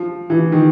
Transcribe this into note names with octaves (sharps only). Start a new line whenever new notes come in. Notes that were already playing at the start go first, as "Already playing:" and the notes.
Already playing: F3
E3
D#3